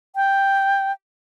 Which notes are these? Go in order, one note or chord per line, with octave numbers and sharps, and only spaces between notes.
G5